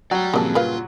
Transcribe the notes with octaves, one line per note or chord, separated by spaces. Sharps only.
F#3 D5 G5
G2 A#2 C#3 F3 A#3 C4 D#5 A5
F4 A#4 B4 F5